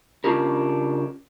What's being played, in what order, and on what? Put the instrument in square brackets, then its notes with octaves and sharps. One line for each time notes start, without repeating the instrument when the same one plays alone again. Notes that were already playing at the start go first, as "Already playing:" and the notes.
[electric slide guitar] C#3 C#4 D4 F4 G4 A#4